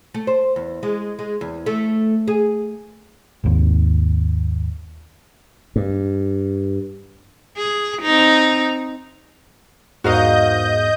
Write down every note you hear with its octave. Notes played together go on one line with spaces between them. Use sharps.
A3
C5
E2
G#3
G#3
E2
A3
G#4
G#1 D#2
G2
G#4
C4 D#4
E2 G#2 F#4 A#4 D#5 F5 G6